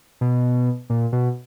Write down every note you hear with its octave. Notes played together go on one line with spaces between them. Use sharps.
B2
A#2
B2